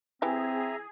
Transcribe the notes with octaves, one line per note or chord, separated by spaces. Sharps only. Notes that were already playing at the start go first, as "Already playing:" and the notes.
E3 C4 G4 G#4 E5 A#5